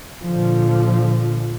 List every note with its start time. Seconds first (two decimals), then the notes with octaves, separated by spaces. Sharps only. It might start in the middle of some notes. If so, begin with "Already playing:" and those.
0.23 A#2 D3 F3